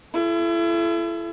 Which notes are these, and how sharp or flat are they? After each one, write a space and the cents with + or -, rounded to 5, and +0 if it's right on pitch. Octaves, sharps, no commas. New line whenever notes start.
E4 +35 A4 -30